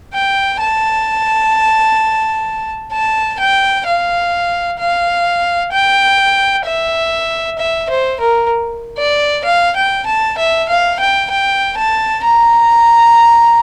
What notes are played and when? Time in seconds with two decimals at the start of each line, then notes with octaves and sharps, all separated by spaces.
0.14 G5
0.60 A5
2.93 A5
3.40 G5
3.86 F5
4.79 F5
5.72 G5
6.66 E5
7.58 E5
7.90 C5
8.20 A#4
8.98 D5
9.45 F5
9.76 G5
10.06 A5
10.38 E5
10.69 F5
11.00 G5
11.31 G5
11.77 A5
12.24 A#5